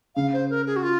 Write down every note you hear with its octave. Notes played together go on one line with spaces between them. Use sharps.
C#3 F5
C5
A#4
G#4
F#4
F4